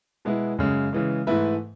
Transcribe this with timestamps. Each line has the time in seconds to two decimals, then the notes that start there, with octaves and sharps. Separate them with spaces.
0.25 B2 G#3 B3 E4
0.59 F#2 C#3 G#3
0.93 C#3 E3 G#3
1.27 G#2 E3 A3 E4 B4